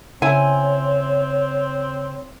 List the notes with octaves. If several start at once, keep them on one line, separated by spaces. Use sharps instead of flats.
C#3 C4 E4 C#5 G#5